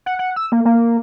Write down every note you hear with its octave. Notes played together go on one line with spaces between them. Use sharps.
F#5
F#5
E6
A#3
A#3